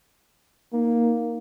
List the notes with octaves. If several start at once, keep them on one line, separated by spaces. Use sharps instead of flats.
A#3 D#4